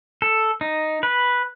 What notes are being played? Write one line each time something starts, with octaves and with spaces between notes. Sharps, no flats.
A4
D#4
B4